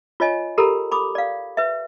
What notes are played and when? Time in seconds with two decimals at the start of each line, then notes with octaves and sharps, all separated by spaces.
0.20 F4 C#5 D#5 G#5
0.58 G4 A4 A#4 A#5 B5
0.92 B5 D6 D#6
1.15 D5 F5
1.57 B4 E5